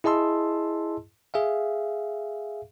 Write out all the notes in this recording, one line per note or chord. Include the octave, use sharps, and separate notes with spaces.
E4 G#4 D#5 A5 C6 E6
G#4 E5 F5